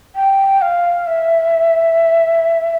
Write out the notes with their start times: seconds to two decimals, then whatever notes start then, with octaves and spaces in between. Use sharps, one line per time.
0.16 G5
0.62 F5
1.07 E5